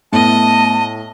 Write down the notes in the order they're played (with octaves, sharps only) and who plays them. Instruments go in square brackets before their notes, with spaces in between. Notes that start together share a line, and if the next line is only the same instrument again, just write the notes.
[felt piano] A2 [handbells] A3 B3 [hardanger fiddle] D#5 [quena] A5